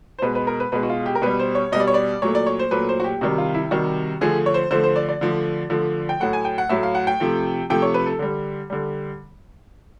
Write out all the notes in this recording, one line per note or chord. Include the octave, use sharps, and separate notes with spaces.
C5
B2 G#3 B4
B4
A#4
B4
B2 G#3 B4
F#4
F4
G4
A#4
B2 G3 B4
C5
C#5
B2 G3 D#5
D5
C#5
D5
A#2 F#3 A3 C#5
D5
C#5
C5
A#2 F#3 A3 B4
C5
F#4
G4
C3 D#3 G3 F#4
F4
E4
C3 D#3 G3 F#4
D3 F3 A3 G#4
C#5
C5
D3 F3 A3 C5
C5
D5
D5
D3 F3 A3
D3 F3 A3
G5
A2 F#3 A3 F#5
G#5
G5
F#5
A2 F#3 A3 E5
F5
F#5
G5
C3 F3 A3
C3 F3 A3 G5
C#5
B4
A4
D3 G3
D3 G3